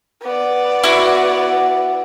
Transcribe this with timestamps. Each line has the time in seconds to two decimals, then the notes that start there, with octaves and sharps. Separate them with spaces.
0.22 B3 D5
0.84 E4 F#4